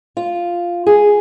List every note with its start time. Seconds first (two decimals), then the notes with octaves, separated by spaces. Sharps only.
0.17 F4
0.87 G#4